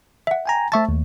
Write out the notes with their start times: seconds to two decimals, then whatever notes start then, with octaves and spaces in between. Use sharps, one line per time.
0.27 E5 F#5
0.46 G5 G#5 A#5
0.72 A3 C5 E5 A5 C#6 A6
0.89 D#2